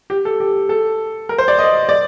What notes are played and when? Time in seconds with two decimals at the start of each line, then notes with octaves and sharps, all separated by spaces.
0.10 G4
0.25 A4
0.40 G4
0.69 A4
1.29 A#4
1.38 C5
1.48 D5
1.58 D#5
1.89 D5